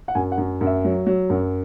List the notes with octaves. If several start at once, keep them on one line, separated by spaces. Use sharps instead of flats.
F#5
F#2 G#5
F#5
F#2
F#2
E5
F#3
F#3
F#2